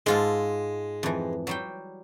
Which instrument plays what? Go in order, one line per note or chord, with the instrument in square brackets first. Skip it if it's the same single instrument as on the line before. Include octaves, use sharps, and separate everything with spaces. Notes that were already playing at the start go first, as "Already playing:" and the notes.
[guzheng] G#2 F4 A4 [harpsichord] G#3
[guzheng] F2 E3
F#3 G3 G5